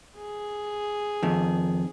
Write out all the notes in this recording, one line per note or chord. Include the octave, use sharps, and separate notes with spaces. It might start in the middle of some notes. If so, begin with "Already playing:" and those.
G#4
F2 D#3